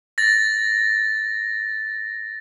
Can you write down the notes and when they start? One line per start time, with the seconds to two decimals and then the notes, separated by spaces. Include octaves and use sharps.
0.18 A6 A#6